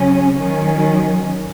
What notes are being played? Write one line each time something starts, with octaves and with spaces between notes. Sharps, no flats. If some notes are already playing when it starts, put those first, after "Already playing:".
Already playing: C#3 F#3 C#4
D#3 F#3 C#4